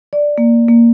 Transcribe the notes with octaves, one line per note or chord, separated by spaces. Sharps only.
D5
A#3
A#3